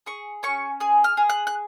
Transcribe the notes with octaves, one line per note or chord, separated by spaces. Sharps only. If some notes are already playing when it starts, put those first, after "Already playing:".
G#4 C#6
C#4 C#6
G#4 D#6
F6
G#4
F#6
F#6